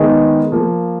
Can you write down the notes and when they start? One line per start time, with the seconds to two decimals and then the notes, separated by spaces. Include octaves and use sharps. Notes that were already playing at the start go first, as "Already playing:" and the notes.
Already playing: D#3 G#3 B3 D#4
0.52 F3 A#3